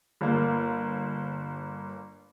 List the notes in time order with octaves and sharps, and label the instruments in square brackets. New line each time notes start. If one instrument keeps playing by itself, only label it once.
[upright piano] G1 A#3